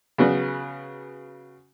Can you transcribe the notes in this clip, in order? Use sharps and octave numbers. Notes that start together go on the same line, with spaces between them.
C#3 F#3 B3